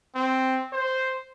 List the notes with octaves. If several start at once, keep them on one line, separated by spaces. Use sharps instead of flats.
C4
C5